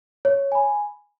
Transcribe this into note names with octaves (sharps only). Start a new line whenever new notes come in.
C#5
G#5 B5